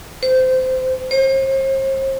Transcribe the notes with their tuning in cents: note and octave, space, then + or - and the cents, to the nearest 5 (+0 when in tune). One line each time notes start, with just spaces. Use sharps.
C5 -20
C5 +40